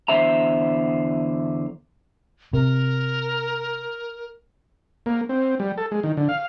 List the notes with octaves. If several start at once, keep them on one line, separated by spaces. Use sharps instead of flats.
E2 G#2 D3 C5 E5 A#5
C3 A#4
A#3
C4
G3
A4
G#3
D#3
D3
F5